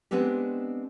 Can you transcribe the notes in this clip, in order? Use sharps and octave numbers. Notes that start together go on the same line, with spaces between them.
G#3 B3 C4 D4 G4